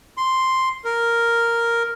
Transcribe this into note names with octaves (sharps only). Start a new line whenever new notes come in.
C6
A#4